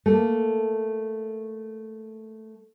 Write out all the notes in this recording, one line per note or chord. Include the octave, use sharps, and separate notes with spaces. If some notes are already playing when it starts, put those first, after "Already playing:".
A3 A#3